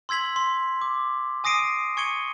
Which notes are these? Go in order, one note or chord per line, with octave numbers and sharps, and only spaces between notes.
C6 E6 G#6 B6 F#7
C6
D6
G#5 D#6 A#6 C7 D7 D#7
G#5 C#6 G#6 C#7 D#7 G7